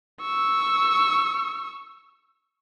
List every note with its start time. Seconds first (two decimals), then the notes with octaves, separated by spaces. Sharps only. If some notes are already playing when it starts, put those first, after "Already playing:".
0.22 C#6 E6